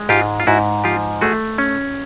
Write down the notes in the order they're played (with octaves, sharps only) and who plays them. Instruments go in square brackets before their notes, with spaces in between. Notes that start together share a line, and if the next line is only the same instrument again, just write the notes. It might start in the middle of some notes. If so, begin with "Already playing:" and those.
Already playing: [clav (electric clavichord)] G#3
G#2 F4 G4
F4
G#2 E4 F#4
F3 F4 G4
A3 F#4 G#4
C#4